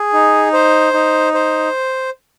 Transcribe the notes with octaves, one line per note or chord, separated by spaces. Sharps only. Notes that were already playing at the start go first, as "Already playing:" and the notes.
Already playing: G#4
D#4
C5
D#4
C5